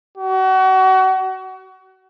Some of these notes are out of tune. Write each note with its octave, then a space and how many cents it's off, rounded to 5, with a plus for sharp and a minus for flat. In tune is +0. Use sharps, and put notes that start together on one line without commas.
F#4 +30